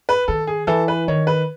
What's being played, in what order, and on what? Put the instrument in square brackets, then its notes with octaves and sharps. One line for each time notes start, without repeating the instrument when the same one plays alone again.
[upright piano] B4
[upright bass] D#3 [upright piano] A4
[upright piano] G#4
[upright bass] E3 [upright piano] A4
[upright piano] B4
[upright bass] D#3 [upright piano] C#5
[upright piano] B4